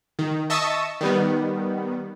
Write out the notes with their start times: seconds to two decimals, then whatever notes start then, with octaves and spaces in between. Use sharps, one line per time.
0.19 D#3
0.50 D#5 E5 A5 C#6 D#6 E6
1.01 D#3 G3 B3